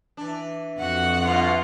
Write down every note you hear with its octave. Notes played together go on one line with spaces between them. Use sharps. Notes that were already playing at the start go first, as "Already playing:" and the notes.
E3 D4
F2 F#4 F#5
G2 B2 E4 F4